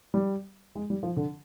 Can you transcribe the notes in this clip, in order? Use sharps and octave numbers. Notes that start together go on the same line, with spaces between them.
G3
G#3
G3
F3
D3